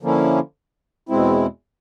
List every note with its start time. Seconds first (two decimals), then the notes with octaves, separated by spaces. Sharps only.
0.02 D3 F3 A#3 C#4 E4
1.09 E2 B2 G#3 C4 E4